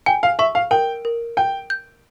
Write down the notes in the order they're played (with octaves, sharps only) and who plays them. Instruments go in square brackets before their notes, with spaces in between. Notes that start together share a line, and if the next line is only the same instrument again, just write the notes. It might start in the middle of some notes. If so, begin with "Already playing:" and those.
[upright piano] G5 [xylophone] G#5
[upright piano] F5
[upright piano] E5 [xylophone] C#6
[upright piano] F5
[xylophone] A#4 [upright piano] G5
[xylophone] A#4
[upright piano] G5 [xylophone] G6
[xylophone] G6